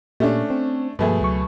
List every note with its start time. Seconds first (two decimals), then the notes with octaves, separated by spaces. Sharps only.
0.20 A#2 A3 A#3 C#4 D4 G4
0.50 C4
0.99 G2 B2 F3 A3 A#3 G#4
1.20 C#2 F#3 C#6